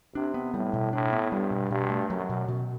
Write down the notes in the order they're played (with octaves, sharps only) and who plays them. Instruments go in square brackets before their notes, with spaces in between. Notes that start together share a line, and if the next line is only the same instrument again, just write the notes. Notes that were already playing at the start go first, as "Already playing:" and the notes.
[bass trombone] C3 [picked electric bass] D4
[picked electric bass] B3
[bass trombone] A2 [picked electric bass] G3
[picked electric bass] B2
[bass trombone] A2 [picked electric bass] D4
[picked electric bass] B3
[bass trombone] G2 [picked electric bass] G3
[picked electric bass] B2
[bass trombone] G2 [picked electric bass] B2
[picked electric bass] A3
[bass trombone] F#2 [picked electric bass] F#3
[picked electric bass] B2
B2